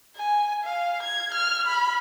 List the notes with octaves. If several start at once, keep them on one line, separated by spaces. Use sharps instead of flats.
G#5
F5
G#6
F6
B5